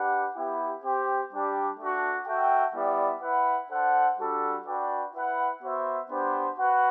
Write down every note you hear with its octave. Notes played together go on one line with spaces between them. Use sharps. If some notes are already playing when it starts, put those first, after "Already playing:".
Already playing: D4 G4 B4 F#5
B3 E4 G4
C4 G4 C5 G5
G3 D4 G4
A3 D4 F#4
F#4 A4 E5 G5
G3 B3 E4 G4 D5
E4 B4 F#5
D4 A4 C5 F#5
G3 D4 F#4 A4
D4 F#4 B4 D5 G5
E4 B4 F#5
B3 F#4 C5 E5
B3 D4 G4 C5
F#4 B4 F#5